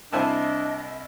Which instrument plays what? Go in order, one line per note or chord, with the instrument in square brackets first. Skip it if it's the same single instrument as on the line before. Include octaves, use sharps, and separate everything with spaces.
[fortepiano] C2 E4 C5 [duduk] D4 [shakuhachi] D#5 [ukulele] F5 G#5 A5